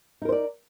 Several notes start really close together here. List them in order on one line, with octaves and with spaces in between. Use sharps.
D#4 A#4 C5 D5